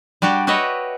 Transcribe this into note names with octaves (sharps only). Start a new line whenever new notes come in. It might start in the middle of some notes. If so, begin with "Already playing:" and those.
G3 D4 F#4 G4
F#4 G4 B4 C#5 D#5 E5